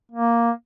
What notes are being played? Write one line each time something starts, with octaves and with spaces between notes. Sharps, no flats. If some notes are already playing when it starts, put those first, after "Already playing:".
A#3